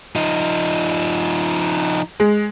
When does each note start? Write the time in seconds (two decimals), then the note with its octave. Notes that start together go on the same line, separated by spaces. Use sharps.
0.16 F3 D#4
2.20 G#3